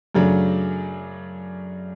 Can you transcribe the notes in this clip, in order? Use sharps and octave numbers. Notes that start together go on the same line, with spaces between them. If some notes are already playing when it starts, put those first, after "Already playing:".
F#2 C#3 F#3 A3 D4